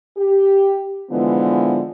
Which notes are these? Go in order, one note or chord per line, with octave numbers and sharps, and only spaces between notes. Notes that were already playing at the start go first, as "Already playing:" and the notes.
G4
D3 E3 F3 G#3 B3